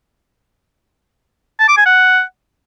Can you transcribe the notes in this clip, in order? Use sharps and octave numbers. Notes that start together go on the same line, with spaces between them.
A5
D6
G#5
F#5